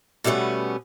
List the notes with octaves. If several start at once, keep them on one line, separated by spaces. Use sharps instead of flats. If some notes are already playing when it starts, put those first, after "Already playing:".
B2 G3 A3 B3 C#4